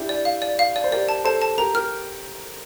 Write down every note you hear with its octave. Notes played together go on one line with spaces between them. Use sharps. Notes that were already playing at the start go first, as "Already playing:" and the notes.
Already playing: D4 E4 G4
D5
F5
D5
F5
D5
C5
G4 A#4 D5
A5
A4 C5 A5
A5
G4 A#4 A#5
G4 A#4 F6